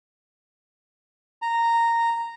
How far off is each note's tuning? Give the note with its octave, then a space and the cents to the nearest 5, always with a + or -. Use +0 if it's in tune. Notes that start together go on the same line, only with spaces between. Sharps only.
A#5 -10